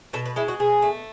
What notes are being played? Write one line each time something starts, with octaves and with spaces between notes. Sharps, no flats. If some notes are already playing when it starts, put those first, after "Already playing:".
B2 A4
B4
G#3 E4
F#4
B2 G#4
A3